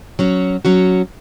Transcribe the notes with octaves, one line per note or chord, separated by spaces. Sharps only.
F#3 C#4 F#4
F#3 C#4 F#4